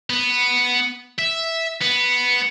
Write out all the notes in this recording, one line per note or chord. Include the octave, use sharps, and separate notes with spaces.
B3
E5
B3